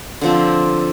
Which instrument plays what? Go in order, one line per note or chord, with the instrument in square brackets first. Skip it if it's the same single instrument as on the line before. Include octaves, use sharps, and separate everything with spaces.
[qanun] D3 F3 C4